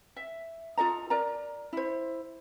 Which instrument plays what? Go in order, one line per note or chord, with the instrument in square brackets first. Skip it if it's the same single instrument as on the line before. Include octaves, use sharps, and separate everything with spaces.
[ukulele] E5
F4 A4 D#5 A#5
A#4 D5 A#5
E4 C5